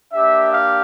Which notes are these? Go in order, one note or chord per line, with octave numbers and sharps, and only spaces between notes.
A#3 D4 G4 E5
F5